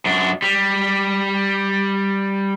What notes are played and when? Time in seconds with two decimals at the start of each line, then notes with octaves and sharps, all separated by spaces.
0.06 F#2 D4
0.42 G3